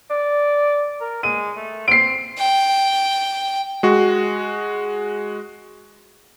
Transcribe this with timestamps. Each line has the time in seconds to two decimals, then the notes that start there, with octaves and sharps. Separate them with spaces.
0.10 D5
1.01 A#4
1.23 G#3 D#7
1.57 A3
1.88 C4 C7 D7
2.38 G5
3.83 G#3 F#4